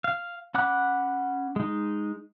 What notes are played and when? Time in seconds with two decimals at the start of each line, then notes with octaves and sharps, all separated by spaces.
0.04 F5
0.54 C#4 F#5 B5 D6 F#6
1.56 G#3 D#4